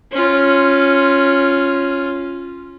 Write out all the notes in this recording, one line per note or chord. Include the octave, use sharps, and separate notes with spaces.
C#4 F4